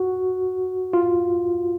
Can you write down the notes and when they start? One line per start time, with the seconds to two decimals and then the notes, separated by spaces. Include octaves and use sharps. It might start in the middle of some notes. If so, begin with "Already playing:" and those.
Already playing: F#4
0.93 F4